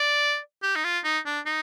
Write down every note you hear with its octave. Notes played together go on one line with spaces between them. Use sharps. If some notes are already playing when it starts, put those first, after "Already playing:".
Already playing: D5
G4
D#4
F4
D#4
D4
D#4